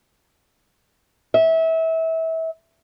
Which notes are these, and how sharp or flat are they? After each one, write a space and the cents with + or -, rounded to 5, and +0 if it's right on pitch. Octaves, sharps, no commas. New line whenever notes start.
E5 -25